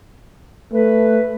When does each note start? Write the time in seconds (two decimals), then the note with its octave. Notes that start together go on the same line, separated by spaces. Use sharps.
0.73 A3 B4